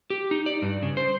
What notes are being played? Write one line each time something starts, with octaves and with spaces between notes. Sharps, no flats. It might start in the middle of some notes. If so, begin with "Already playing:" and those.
G4
D#4
D5
G2
C#3
C5